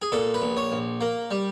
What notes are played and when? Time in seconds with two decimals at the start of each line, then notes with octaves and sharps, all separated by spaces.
0.02 G#4
0.12 A#2 A4
0.34 B4
0.42 A#1
0.57 C#5
0.72 A#1
1.01 A#3
1.31 G3